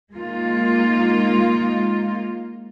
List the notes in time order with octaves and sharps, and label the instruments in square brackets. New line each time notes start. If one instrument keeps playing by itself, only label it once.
[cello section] G#3 A#3 D#4 F4